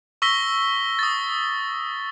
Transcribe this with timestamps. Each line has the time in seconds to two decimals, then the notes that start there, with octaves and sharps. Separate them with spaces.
0.22 C#6 E6 A#6 B6 G7
0.99 D#6 A6